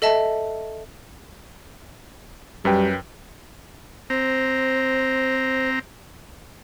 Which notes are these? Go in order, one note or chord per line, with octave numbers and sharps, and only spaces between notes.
A4 D#5 E5 A5
F#2 G3 B4 G5
C4 C5 A#5